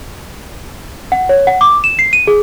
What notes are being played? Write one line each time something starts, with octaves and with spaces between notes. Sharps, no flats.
F#5
C#5
F#5
D6
E7
C7
D#7
G#4